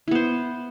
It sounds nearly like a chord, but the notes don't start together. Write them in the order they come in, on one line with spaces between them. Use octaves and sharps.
E4 B3 C5